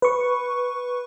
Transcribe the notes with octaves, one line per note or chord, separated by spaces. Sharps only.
B4 C#6